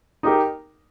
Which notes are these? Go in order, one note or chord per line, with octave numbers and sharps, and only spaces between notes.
D#4 G4 A#4